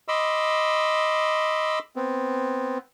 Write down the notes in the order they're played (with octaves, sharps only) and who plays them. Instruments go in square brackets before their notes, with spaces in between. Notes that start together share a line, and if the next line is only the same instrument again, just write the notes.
[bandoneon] D#5 B5 C6 D6 E6
B3 C4